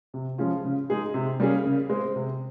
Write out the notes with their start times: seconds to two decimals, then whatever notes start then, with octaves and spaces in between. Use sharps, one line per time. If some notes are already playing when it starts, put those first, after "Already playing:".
0.14 C3
0.38 F3 G#3 C#4 F4
0.65 C#3
0.90 G#3 D#4 G#4
1.14 C3
1.40 G3 A#3 C#4 G#4
1.65 C#3
1.89 G#3 C4
2.16 C3